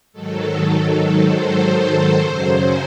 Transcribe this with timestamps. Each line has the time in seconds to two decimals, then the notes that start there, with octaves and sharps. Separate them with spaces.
0.13 G#2 D#3 F#3 A4
1.15 C5
1.67 A4
2.18 F#2 C#3 F#3 C5